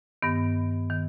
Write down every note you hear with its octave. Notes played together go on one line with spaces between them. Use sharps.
G2 D#3 B3
D#3